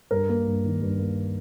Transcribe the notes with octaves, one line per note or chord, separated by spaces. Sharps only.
G2 A#4
A#3
G2
D#3
G2
A#3